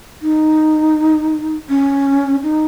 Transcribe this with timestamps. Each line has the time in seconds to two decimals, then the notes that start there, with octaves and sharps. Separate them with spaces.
0.22 D#4
1.70 C#4
2.43 D#4